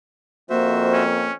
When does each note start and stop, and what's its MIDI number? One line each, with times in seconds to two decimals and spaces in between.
0.50 1.36 41
0.50 1.29 58
0.50 1.03 66
0.50 1.03 72
0.50 1.03 76
0.94 1.34 61